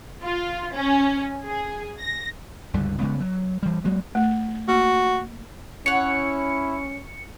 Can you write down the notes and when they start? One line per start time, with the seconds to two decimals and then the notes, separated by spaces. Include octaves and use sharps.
0.22 F4
0.74 C#4
1.44 G#4
1.99 A#6
2.74 C#2 G2 D3 G3
2.98 C#3 G#3 B3
3.20 F#3
3.63 E3 G3
3.84 F#3 G#3 A#3
4.15 A3
4.68 A#3 F#4
5.86 C#4 E4 C#5 F#5 C#7